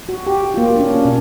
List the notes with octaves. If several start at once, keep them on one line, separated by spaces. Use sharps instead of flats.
F#4
G4
A#3 F4
C#4 D4
B2 D5